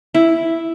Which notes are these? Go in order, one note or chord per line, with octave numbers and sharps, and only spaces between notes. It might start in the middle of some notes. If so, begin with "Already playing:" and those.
E4